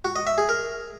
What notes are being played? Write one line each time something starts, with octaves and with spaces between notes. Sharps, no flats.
F#4
D#5
E5
G#4
A#4